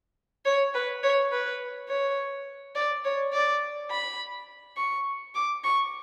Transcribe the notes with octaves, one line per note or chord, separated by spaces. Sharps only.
C#5
B4
C#5
B4
C#5
D5
C#5
D5
B5
C#6
D6
C#6